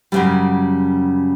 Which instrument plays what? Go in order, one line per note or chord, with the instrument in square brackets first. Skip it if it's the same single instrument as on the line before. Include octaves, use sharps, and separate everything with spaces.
[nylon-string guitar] F#2 C#3 G3